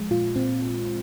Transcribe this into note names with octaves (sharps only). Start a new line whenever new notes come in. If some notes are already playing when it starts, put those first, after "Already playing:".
Already playing: F3 G#3
A#2 F4
A#2 C4